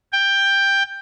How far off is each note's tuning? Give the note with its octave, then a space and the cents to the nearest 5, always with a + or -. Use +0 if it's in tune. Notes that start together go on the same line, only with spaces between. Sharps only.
G5 +10